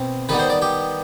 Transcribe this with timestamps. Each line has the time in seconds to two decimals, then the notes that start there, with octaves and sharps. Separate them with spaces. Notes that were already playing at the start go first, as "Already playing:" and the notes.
Already playing: B2 C4
0.29 D#3 G3 B3 B4
0.39 C5
0.50 D5
0.62 G4